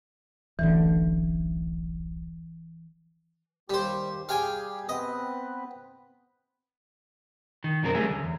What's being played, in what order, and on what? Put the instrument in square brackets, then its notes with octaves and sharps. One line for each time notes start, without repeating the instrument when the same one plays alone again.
[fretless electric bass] D1 A1 D3 [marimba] E3
[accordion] D#2 G4 [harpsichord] G3 C5
[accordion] G3 G4 G#4 [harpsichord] F5 G5 G#5
[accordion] B3 C4 B4 [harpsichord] D#5
[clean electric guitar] D#3
B1 F2 C#3 F#3 C4 A#4
F#3 G3 A3 C4 C#4 G#4
D2
E2